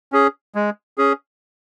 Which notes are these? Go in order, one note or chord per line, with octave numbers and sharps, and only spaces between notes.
C#4 G#4
G#3
C#4 G#4